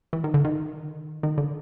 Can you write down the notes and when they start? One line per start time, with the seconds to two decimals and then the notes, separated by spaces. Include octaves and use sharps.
0.13 E3
0.24 D#3
0.34 D3
0.44 D#3
1.23 D#3
1.38 D3